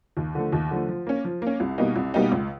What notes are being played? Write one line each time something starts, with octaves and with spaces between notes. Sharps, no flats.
D#2
D3 F3 A3
D#2
D3 F3 A3
F3
A#3 C#4
F3
A#3 C#4
C2
B2 G3 A#3 D#4
C2
B2 G3 A#3 D#4
C#2